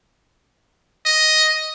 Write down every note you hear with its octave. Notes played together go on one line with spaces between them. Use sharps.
D#5